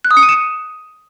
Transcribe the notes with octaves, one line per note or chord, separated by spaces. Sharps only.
F#6
D#6
C#7
D#7
E7